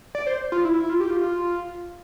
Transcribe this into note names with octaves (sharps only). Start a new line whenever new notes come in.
D5
C5
F4
E4
F4
G4
F4